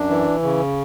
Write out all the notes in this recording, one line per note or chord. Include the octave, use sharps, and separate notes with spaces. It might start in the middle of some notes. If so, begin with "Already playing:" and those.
Already playing: F#2 D4
E3
C#3